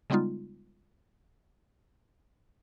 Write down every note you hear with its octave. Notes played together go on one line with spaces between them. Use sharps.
C#3 G3 G#3 B3 D#4 F4